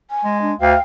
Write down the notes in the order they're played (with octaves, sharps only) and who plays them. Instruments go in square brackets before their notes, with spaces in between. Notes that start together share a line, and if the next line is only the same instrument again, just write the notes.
[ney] G#5
[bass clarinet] G#3
[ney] D4
[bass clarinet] D2 [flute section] F5 [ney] G5